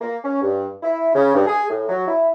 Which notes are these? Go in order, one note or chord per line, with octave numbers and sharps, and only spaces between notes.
A#3
C#4
G2
E4
C#3
G2
G#4
A2
F#3
E4